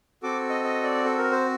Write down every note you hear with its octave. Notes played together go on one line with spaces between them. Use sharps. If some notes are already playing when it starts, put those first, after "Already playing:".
C4 F#4 A4 D6
D#5
D#5
D5
A4
A#4
C5